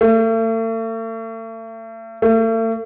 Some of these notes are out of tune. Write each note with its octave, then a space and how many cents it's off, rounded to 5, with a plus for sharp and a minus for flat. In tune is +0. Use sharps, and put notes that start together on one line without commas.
A3 +40
A3 +40